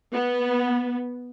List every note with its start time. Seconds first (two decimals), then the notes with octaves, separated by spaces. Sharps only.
0.14 B3